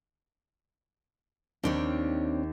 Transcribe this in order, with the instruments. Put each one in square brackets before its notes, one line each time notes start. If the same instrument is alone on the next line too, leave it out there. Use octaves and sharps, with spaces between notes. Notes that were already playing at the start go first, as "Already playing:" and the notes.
[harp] D#2 [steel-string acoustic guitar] C4 D4 C#5